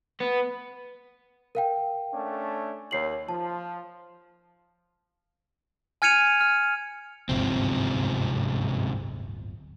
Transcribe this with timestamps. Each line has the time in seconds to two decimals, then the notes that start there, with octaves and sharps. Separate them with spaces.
0.20 B3
1.55 A#4 F5 G5
2.12 A3 C#4 D4
2.91 D#2 C#5 C7 F#7
3.29 F3 A5
6.02 G#5 F6 G#6 C#7 D#7 F7
6.41 F6
7.29 D1 G1 G#2 C3 F3 C4